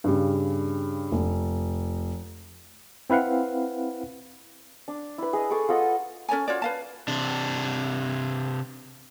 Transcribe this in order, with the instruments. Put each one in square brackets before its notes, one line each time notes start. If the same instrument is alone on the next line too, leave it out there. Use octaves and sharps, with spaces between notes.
[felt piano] G2 C#3 G3
F1
[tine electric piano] C4 E4 B4 F5 F#5
[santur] D4
E4 B4
G#4 D#5
G#4 A4 C#6 D6
F4 A4 D#5 F#5
[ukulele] C#4 A4 C#5 G#5
F4 F#4 C#5 D5
B4 F5 A5
[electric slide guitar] C3 D4